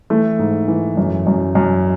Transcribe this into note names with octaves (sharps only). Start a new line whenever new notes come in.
E3 A3
G#2
E3
F#2
F#2
F#2